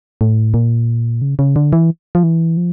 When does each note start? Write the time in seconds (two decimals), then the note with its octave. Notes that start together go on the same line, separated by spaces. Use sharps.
0.21 A2
0.54 A#2
1.22 C#3
1.39 C#3
1.56 D3
1.73 E3
2.15 F3
2.23 E3
2.57 F3